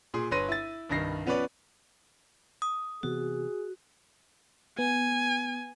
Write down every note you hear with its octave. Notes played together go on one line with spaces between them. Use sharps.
A#2 G#4 C6
G1 B4 C#5 C6 A#6 D#7
E4 A6
C2 G2 D#3 A#6 C7
F3 B3 C#4 B4 C#5 D5
D#6
C3 E3 B3 F#4 G#4
B3 G#5